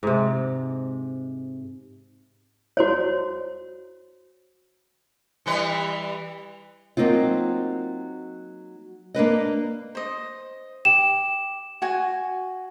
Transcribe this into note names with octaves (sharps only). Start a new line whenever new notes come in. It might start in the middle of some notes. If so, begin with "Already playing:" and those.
G#2 C3
F#4 C5 C#5
E3 G3 B4
F#3 A#3 C4 D#4 F4
A#3 D4 B4 D#5
C5 D#5
G4 E7
F#4 G#5